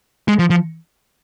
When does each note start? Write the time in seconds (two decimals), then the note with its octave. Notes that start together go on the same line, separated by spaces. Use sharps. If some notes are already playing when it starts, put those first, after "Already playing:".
0.28 G#3
0.39 F3
0.50 F3